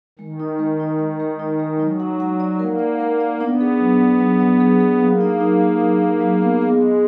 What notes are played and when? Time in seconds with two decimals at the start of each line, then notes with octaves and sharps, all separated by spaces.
0.19 D#3 G#3
0.40 D#4
0.59 G#3
0.80 D#4
0.99 G#3
1.20 G#3
1.39 D#4
1.59 G#3
1.80 F#3 D#4
2.00 F#5
2.20 F#5
2.40 D5
2.59 A#3 A#4
2.79 D5
3.00 A#4
3.20 D5
3.40 B3 D4
3.61 G#4
3.80 F#3
4.01 F#3
4.20 F#3
4.40 F#3
4.60 G#4
4.80 G#4
5.01 F#3 A#3
5.21 D#4
5.40 D#4
5.61 F#3
5.80 D#4
6.00 D#4
6.20 F#3
6.41 B3
6.61 G#3 G#4
6.81 G#4